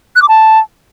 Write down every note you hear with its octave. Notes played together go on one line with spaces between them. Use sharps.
F#6
D6
A5